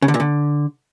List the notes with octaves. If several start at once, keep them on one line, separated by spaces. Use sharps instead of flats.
C#3
D3
A#2
D3